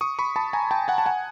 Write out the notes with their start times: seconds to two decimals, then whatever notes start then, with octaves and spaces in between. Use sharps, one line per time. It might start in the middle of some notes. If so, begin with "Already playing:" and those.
0.01 C#6 D#6
0.19 B5 C#6
0.36 A5 B5
0.53 G#5 A#5
0.71 G5 A5
0.88 F#5 G#5
0.98 A5
1.06 F#5 G#5